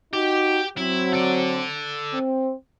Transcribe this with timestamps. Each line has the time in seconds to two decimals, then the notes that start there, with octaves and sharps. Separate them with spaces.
0.13 D#4 F#4 G4
0.77 F#3 C4 E4
1.13 A4 D5
2.14 C4